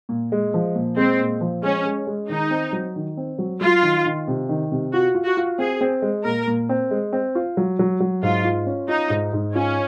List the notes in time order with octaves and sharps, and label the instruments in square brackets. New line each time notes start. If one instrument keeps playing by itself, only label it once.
[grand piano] A#2
G#3
F3
A#2
[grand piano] G#3 [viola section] C4
[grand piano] A#2
F3
[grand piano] G#3 [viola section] C#4
[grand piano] G#3
G#3
[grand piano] D#3 [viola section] D#4
[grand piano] C4
F#3
D#3
C4
F#3
[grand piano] F#3 [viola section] F4
[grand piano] D#3
D#3
C3
D#3
C3
[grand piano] F4 [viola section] F#4
[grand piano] F4
[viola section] F#4
[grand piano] F4
[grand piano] C4 [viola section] G#4
[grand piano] C4
G#3
[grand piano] A#2 [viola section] A#4
[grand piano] A#2
C4
G#3
C4
F4
F#3
F#3
F#3
[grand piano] G#2 [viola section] F4
[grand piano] F4
C#4
[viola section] D#4 [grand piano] F4
[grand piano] G#2
G#2
[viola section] C#4 [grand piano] F4